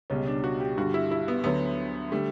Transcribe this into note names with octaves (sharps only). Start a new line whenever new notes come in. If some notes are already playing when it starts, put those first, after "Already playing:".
C#2 B2 G3 C#4
D4
F#4
G4
G2 D3 G3 F#4
E4
E4
B3
D2 D3 F#3 B3
D3 G3 A3